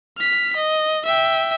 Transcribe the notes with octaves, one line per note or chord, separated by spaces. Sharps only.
F6 B6
D#5
E5 G5